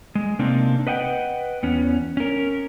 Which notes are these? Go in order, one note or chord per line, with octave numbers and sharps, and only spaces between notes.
G#3
C3 A#3 C4 D4 D#4
B4 D#5 F#5 G5
E2 B3 C#4
C#4 A#4